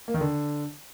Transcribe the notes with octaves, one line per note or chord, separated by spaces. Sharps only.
A#3
D#3
D3